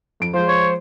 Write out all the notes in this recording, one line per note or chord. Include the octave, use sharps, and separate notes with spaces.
F2 D7
F3 G#3 C5
C#5